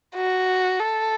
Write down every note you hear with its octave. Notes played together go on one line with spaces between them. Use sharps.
F#4
A4